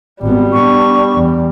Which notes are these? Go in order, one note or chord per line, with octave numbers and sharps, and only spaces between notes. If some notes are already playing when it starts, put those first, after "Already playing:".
G#1 G3 B3
B3 D4 C#6
E2